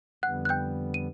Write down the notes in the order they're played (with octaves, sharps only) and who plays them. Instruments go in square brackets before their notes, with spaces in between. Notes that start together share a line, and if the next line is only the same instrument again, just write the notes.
[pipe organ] F2 D3 G3 B3 [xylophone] F#5 F#6
[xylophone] F#6
G5 G6
D#7